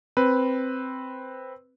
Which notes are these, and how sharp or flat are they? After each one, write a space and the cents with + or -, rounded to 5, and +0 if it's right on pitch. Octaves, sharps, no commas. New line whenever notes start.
C4 +0 B4 +0